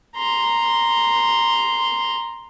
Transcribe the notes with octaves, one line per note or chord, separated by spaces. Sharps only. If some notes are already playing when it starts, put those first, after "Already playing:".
A#5 C6